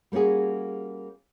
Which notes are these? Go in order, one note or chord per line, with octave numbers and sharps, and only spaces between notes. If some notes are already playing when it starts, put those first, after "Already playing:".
G3 A#3 C#4 F#4 G#4